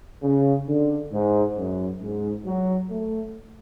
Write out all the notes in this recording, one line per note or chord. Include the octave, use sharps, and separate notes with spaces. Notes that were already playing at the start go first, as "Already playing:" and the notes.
C#3
D3
G#2
F#2
G#2
F#3
A3